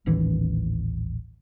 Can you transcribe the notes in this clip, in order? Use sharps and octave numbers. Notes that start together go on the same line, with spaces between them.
D#1 A1 D#3 E3